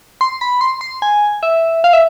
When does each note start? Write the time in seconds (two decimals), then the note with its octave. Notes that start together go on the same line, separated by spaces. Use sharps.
0.21 C6
0.41 B5
0.61 C6
0.81 C6
1.02 G#5
1.43 E5
1.84 F5
1.93 E5